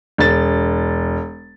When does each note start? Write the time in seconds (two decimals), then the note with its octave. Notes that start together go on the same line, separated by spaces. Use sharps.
0.18 E1 A6